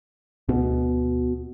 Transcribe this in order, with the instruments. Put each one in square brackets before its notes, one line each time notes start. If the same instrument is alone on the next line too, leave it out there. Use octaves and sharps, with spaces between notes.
[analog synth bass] D2 [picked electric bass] B2